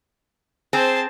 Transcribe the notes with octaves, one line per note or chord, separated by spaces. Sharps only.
C4 G#4 C5 A5